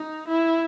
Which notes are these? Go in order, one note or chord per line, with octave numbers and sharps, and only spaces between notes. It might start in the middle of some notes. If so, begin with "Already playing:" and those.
Already playing: D#4
E4